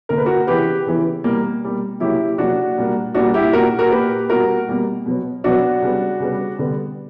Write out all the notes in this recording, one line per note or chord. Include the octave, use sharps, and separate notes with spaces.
D3 A#3 A#4
B4
F#4 A#4
C#3 E3 B3 G4 B4
C#3 E3 B3
B2 G3 A#3
B2 G3 A#3
C#3 F#3 A#3 E4 G4
C#3 F#3 A#3 D4 F#4
A#2 G3 A#3
A#2 G3 A#3 D4 F#4
E4 G4
A#2 A#3 F#4 A#4
F#4 A#4
A#2 A#3 G4 B4
B2 G3 A#3 F#4 A#4
B2 G3 A#3
B2 F#3 B3
B2 F#3 B3 D4 F#4
C#3 G3 B3
C#3 G3 B3
D3 G3 B3